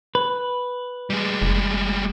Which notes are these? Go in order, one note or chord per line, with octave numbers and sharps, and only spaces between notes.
B4
G3 G#3
F#1